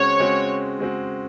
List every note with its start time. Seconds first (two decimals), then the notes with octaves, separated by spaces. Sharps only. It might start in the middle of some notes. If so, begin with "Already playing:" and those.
Already playing: C#3 G#3 C4 F#4 C#5
0.20 C#3 G#3 C4 F#4
0.79 C#3 G#3 C4 F#4